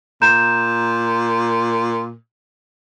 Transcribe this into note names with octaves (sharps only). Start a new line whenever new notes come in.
A#2 A#5 G6 E7